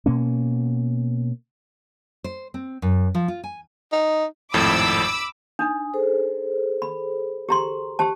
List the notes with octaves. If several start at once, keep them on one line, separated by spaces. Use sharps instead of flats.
B2 A#3 C#4
C5
C4
F#2
F3
F4
G#5
D#4
G#1 F2 A2 B5 D6 E6
D4 D#4 G#5 D#6
G#4 A4 C5
B5
G4 A#5 C6
G4 C5 A5